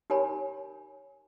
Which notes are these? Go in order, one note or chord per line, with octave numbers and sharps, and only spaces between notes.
D#4 G4 A#4 C#5 G#5 B5